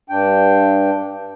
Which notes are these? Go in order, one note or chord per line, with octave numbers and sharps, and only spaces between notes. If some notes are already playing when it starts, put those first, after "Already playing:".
G2 D4 G5